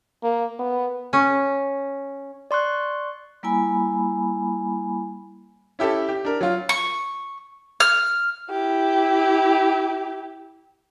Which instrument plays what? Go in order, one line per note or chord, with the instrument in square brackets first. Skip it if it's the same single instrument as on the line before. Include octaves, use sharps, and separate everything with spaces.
[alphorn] A#3
B3
[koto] C#4
[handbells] D5 C6 C#6 F#6
[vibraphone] G3 A#3 E4 G#5 B5
[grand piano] C#4 E4 G4 A4
G4
D4 A#4
F#3 F4
[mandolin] C#6
F6
[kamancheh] E4 G4